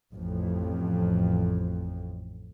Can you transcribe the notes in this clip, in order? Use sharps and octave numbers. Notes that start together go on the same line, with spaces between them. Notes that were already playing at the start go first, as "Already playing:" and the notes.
A1 F2